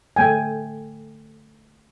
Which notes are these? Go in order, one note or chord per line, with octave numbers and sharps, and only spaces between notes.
A3 G5 G#5